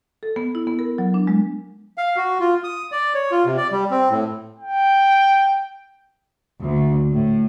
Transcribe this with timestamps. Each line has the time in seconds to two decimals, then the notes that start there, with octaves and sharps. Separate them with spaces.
0.23 A4
0.36 B3
0.55 E4
0.67 B3
0.79 A#4
0.98 F#3
1.14 D4
1.27 G#3
1.98 F5
2.16 F#4
2.40 F4
2.64 D#6
2.92 D5
3.14 C#5
3.31 F4
3.46 C3
3.57 D5
3.72 G3
3.91 C4
4.09 A2
4.59 G5
6.61 D2
7.11 A2